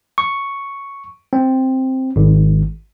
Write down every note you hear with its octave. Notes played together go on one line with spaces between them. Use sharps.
C#6
C4
G#1